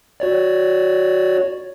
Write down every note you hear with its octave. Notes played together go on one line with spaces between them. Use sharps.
F#4 C#5 D5